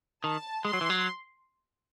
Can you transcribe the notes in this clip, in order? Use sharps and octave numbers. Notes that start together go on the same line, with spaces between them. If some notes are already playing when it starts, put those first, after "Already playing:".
D#3 A5
G#3 C6
F#3
E3
F#3